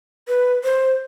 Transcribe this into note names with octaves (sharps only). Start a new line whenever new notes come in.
B4
C5